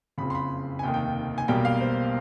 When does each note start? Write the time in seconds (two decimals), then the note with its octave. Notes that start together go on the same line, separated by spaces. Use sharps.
0.18 F#1 F2 C#3 B5
0.30 C6
0.35 B5
0.79 G#5
0.83 F1 D#2 D#3 G5
0.94 G5
1.38 G#5
1.48 B1 B2 G3 A#3 G5
1.65 F5
1.81 C5